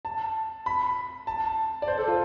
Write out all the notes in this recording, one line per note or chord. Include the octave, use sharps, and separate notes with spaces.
A5
B5
A5
D5
C5
A4
F4